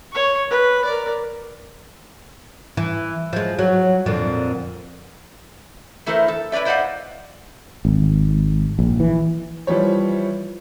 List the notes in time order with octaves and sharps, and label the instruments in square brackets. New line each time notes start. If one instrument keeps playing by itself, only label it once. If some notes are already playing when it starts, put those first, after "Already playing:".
[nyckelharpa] C#5 C#6
B4
A#4 D5
[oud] E3
F3 G#3
F#3
F2 A#2 D3
[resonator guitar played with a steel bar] E3 A3 E4 A4 A#4 C5
A4
E4 B4 C#5 D5 E5
E4 C5 D5 D#5 F5 F#5
[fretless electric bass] G#1
A#1
E3
[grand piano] E3 F3 G3 C#5